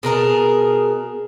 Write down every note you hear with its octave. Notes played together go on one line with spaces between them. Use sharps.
B2 G#4 A#4 A5